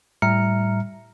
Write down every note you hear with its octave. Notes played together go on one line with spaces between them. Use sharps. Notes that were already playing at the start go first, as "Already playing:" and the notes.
A2 G3 E5 A#5 F6 C#7